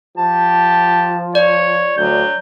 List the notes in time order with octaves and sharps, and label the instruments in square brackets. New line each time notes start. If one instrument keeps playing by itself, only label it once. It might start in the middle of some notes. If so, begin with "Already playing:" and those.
[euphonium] F3 [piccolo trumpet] G4 [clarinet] A5
[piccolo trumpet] C#5 [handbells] D5
[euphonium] D2 [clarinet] F#3 [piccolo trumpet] G6